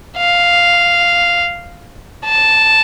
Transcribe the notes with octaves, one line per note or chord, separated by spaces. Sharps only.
F5
A5